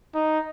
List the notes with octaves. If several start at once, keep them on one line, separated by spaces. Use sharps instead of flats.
D#4